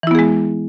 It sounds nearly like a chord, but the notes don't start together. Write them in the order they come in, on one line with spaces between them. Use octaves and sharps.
E3 E4 B3 G#4 G#3